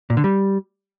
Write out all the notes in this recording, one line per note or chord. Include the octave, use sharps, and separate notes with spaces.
A#2
D3
G3